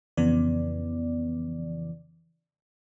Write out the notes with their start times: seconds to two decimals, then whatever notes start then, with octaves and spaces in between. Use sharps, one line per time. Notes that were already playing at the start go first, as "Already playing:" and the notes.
0.17 F2 C#3 E3 B3 D5